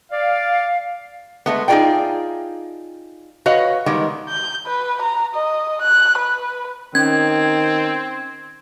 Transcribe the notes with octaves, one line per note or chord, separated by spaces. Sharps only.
D5 F5
G#3 A3 B3
D#4 F4 G4 G#4 D5 G5
F#4 B4 C#5 D#5 F5
D#3 G3 G#3 B3
G6
B4
A#5
D#5
F#6
B4
D#3 C4 C#4 G#6